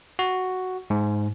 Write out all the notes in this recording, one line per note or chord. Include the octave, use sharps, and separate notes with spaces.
F#4
G#2